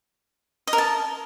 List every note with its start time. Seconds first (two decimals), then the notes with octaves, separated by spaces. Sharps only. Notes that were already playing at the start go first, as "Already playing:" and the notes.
0.67 D#5
0.73 A#4
0.78 A5